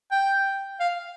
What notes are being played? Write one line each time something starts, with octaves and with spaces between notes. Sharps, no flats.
G5
F5